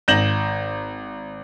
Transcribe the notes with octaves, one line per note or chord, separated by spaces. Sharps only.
G#1 G6 A#6 E7 F#7